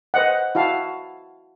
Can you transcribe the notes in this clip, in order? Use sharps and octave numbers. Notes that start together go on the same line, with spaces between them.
B4 C5 D#5 F#5
E4 F#4 F5 A5